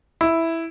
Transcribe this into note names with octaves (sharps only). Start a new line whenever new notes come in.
E4